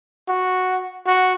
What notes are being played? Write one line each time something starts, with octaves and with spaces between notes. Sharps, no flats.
F#4
F#4